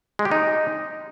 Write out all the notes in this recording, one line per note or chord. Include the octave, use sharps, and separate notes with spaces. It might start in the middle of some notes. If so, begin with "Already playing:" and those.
G#3
G4
D#4